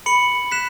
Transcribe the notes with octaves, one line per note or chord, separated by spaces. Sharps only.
B5 C#7 F#7
F#6 B6 E7